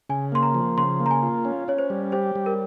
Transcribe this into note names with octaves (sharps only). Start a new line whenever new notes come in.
C#3 G#5
A#3 C6
A#5
F3
C#3 C6
A#3
A#5
G#5
F4
C#4
C#4 C#5
C5
G3
G4 C5
G3
A#4